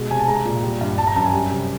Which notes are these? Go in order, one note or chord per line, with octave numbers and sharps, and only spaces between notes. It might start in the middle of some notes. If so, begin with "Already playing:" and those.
Already playing: B2 G#3
C3 G#5
A5
G#3 A#5
A#2
G3
G2
G3 A5
A#5
F#2 A5
G#5
G3
C3